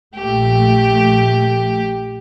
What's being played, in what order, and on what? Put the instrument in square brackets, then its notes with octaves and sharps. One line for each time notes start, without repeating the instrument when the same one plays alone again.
[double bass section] A#1 A3 [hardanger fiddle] G4